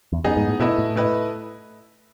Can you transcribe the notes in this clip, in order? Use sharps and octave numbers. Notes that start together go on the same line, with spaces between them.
E2
F#2 B3 D#4 G#4 D#5
G#2
A2
B2 A3 E4 B4 D#5
A2
A3 E4 B4 D#5